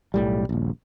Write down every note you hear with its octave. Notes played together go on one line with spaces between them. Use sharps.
B1 A2 G3
D#1 A#1